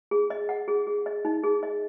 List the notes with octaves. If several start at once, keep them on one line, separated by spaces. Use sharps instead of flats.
G#4
D#5
F#5
G#4
G#4
D#5
D#4
G#4
D#5